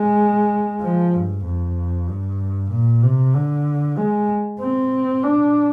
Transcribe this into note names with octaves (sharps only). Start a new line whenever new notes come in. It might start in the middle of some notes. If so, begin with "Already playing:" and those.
Already playing: G#3
F3
G2
F2
G2
A#2
C3
D3
G#3
C4
D4